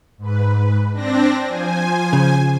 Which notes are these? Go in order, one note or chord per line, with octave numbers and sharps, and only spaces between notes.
G#2 B4
C4 D4 A#6
F3 C5 G#5
C#3